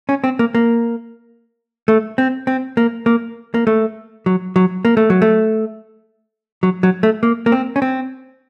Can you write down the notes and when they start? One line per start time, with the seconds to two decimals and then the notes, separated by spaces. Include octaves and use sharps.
0.09 C#4
0.24 C4
0.39 A#3
0.55 A#3
1.88 A3
2.18 C4
2.47 C4
2.77 A#3
3.06 A#3
3.54 A#3
3.67 A3
4.26 F#3
4.56 F#3
4.85 A#3
4.97 A3
5.10 F#3
5.22 A3
6.63 F#3
6.83 F#3
7.03 A3
7.23 A#3
7.46 A#3
7.52 C4
7.76 C#4
7.82 C4